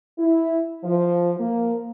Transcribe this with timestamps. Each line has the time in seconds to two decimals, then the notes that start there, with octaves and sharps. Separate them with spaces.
0.18 E4
0.84 F3
1.40 A#3